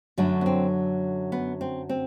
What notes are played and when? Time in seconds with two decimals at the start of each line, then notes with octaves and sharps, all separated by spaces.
0.18 F#2 D3 F#3 A3 D4
0.41 B3
0.46 C4
1.32 B3
1.61 C4
1.89 C4